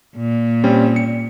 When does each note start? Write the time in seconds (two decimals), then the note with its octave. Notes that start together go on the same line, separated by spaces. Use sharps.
0.16 A#2
0.64 G3 C4 C#4
0.96 C#7